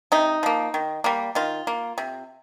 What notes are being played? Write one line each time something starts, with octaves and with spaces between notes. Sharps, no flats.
C3 D#4
F3 A#3
D#3
G3 A#3
D#3 F4
A#3
C3